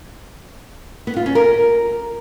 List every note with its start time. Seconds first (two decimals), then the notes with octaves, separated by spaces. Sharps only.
1.07 B3
1.16 F4
1.26 C#4
1.35 A#4